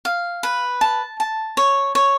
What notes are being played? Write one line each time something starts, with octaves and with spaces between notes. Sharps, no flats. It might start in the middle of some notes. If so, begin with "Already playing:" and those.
F5
B4
A5
A5
C#5
C#5